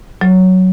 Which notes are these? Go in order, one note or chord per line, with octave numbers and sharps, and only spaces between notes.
F#3